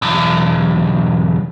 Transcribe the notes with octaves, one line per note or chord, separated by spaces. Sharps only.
B1 E2